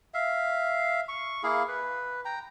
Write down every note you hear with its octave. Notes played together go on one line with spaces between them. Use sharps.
E5 F5
C#6
A#3 E4 G#4 F5
B4
G5 A#5